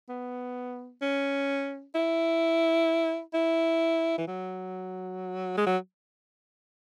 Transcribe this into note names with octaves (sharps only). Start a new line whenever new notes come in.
B3
C#4
E4
E4
E3
F#3
G#3
F#3